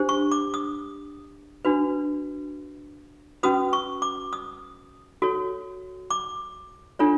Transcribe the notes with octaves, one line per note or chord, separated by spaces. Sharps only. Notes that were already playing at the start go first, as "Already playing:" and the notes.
Already playing: D4 G4 C5
C#6
D6
D#6
D4 F#4 B4
C#4 F#4 B4 D#6
C#6
D6
D#6
F#4 A4 C#5
D6
D4 F4 A4 C#5